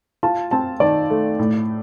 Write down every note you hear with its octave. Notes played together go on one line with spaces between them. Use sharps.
F4 A5
C4 A5
D#3 D5
A3
A2